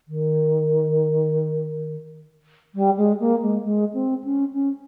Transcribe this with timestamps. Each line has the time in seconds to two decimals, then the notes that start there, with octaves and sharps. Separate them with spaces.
0.07 D#3
2.74 G3
2.97 G#3
3.19 A#3
3.41 G#3
3.63 G#3
3.93 C4
4.23 C#4
4.53 C#4